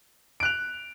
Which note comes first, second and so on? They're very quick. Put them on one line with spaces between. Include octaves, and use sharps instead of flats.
D7 F#6 F7